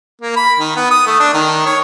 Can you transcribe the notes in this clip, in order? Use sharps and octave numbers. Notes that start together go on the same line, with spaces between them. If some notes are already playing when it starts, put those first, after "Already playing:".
A#3
B5
D#3
B3
D#6
A3
D4
D#3
C#5